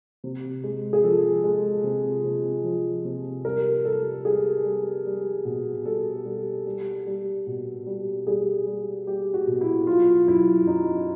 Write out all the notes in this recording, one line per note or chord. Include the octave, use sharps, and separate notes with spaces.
C3
G#3
G#4
F3 A4
G#3
C3
C3
F3
C3
G3 A#4
G3 A4
G3 G#4
G3
G3
B2
G3 A4
G3
G3
G3
B2
G3
G3 G#4
G3
G3 G4
F#4
B2
E4
F#3 F4
F#2 E4
F#2 D#4